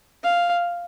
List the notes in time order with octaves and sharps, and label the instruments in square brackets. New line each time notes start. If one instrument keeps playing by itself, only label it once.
[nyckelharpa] F5